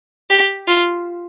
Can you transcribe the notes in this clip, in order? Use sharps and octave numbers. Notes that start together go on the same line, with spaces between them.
G4
F4